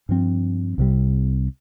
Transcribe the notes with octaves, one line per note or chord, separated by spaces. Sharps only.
G2 F3 C4
C2 C3 G3